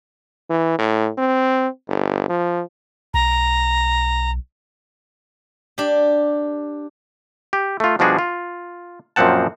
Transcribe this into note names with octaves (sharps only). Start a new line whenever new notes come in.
E3
A2
C4
G1
F3
B1 A#5
D4 G4
G4
A3 F4
B2 F3 G3 D4 F#4 G#4
F4
F#2 A#2 F3 C4 F#5 A5